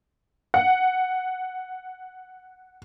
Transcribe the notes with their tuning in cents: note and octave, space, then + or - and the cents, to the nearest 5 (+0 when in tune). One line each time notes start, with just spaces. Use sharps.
F#5 +0